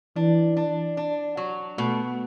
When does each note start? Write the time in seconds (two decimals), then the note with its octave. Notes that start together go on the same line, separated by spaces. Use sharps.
0.16 E3 D4
0.57 D4
0.97 D4
1.37 F#3
1.78 B2 A3